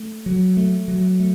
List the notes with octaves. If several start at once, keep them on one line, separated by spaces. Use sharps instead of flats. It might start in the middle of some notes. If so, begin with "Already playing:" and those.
Already playing: A3
F#3
A3
F#3
A3